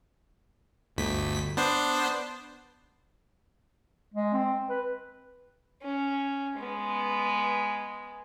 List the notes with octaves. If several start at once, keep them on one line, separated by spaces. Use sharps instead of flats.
G1 D2 B6
B3 D4 C5
G#3
C4
B4
C#4
G#3 B3